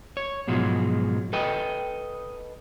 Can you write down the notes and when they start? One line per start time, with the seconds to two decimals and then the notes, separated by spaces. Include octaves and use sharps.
0.17 C#5
0.47 G#2 B2 F3 F#3 G#3
1.33 A4 B4 D#5 G5